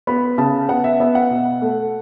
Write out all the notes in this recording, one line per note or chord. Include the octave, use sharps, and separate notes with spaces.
B3 B5
C#3 A5
B3 F#5
E5
B3 E5
F#5
B2
A3